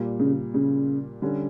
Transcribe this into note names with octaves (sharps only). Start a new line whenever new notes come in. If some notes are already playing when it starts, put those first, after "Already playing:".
Already playing: A#2 G3 A#3
C#3
C#3
D3 G3 C#4